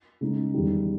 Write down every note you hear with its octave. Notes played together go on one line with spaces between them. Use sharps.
C#3 G#3 D#4
E2 D#3 G3